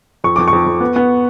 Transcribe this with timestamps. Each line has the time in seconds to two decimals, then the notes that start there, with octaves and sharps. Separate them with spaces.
0.24 F2 C#6
0.36 F2 D6
0.48 C#6
0.53 F2
0.66 F2
0.80 B3
0.96 B3